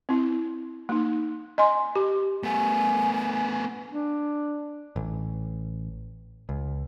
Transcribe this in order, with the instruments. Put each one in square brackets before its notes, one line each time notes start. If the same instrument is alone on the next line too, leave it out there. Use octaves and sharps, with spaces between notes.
[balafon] C4 E4
A#3 D#4
D#5 G#5 C6
G4
[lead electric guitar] A3 B3 [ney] G#5
[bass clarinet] D4
[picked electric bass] A1
C#2